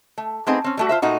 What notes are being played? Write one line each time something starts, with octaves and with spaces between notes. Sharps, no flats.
A3
A3 B3 C4 D#4 G#4
C4 C#4
G3 A3 F#4
F4 C5 E5
A#2 A3 D#4 F#4